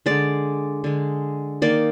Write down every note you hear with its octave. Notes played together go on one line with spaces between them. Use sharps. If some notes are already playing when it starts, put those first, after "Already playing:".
D3 G#3 D5
D3 G#3
D#3 A#3 D5